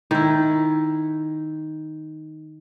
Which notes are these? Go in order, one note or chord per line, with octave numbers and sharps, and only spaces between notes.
D#3 E4